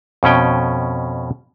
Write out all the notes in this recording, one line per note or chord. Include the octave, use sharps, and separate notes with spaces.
F2 B2 C#4 G5